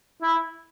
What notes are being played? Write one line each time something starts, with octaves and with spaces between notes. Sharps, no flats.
E4